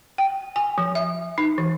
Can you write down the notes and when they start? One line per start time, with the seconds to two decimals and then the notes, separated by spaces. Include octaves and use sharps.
0.18 G5
0.56 G#5
0.78 F3
0.95 E5
1.38 D#4
1.58 E3